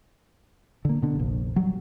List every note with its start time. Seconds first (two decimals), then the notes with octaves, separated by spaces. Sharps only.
0.85 D3 A#3
1.02 B2 D3
1.15 F1 A#1
1.56 F#3 G3